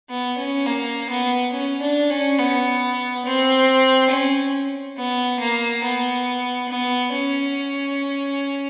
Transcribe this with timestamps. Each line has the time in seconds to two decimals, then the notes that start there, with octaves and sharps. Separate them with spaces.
0.09 B3
0.38 C#4
0.66 A#3
1.09 B3
1.52 C#4
1.81 D4
2.10 C#4
2.39 B3
3.25 C4
4.11 C#4
4.97 B3
5.39 A#3
5.83 B3
6.69 B3
7.13 C#4